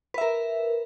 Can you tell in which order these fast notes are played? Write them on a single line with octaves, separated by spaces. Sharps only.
B4 E5 A#4